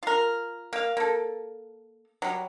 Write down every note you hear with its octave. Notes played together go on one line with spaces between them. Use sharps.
F4 A#4
A#3 F5
A#3 A4
F#3 G3